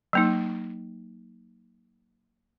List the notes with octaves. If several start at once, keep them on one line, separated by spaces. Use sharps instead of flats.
F#3 A#3 D#4